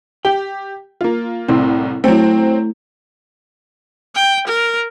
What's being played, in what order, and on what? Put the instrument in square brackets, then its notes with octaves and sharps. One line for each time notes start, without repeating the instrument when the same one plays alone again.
[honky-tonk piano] G4 [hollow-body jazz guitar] G5
[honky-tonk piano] A#3 F4
[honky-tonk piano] C2 A2 [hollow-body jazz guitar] C4
[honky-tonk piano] F#3 C4 [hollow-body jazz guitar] A3 E4
[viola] G5
A#4